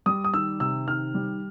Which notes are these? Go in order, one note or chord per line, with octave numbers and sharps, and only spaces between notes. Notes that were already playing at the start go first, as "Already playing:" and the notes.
G3 D#6
D#6
D#3 E6
C3 E6
D#3 F6
G3